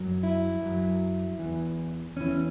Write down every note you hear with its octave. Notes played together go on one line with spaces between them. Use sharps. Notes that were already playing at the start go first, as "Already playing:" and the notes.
Already playing: F#2 F#3
E4
F#2 F#3
E2 E3
E2 E3 C#4